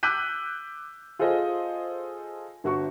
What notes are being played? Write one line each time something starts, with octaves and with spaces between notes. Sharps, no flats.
D6 E6 F#6 G6 B6 D#7
F4 G#4 A4 C5 D#5
G1 F#4 C#6